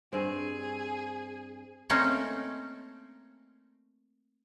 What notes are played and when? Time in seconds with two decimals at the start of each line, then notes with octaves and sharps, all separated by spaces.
0.13 G2 C4 G#4
1.90 A3 A#3 C4 C#4 D#4